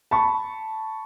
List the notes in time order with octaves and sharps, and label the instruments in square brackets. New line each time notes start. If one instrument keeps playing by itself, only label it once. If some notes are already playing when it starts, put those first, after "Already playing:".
[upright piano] A5 B5 C#6